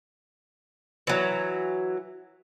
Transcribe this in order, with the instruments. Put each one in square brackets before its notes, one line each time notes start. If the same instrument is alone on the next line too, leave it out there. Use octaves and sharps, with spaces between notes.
[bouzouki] E3 F#3